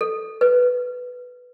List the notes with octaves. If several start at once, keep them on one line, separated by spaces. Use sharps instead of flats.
A4
B4